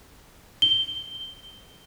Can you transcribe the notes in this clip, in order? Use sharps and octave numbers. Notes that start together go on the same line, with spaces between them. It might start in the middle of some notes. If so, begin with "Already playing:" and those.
G7